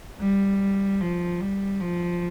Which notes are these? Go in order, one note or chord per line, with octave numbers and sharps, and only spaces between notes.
G3
F3
G3
F3